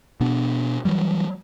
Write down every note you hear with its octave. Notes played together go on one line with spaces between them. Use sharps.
B2 B3 D4
E3 F#3 G3